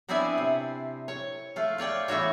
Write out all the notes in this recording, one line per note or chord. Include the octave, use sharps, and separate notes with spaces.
B3 C4 D4 E4 D5 G#5
C3
C#5
A3 F4
F4 C#5 D5 G5
E3 A3 B3 F#4 C#5